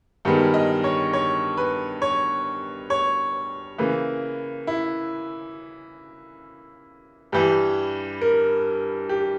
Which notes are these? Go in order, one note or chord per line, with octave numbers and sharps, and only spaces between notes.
G2 D#3 G#3 B3
D#5
C#5
C#5
B4
C#5
C#5
C#3 E3 A#3 B4
E4
G2 E3 G3 G4
A#4
G4